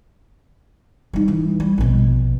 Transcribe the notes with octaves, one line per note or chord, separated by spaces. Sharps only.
G3 D#4
E3
G3
A#1 B2